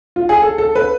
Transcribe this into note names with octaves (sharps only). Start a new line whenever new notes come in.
F4
G#4
A4
A4
B4